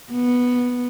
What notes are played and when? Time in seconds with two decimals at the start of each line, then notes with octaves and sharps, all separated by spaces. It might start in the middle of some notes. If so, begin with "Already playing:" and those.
0.12 B3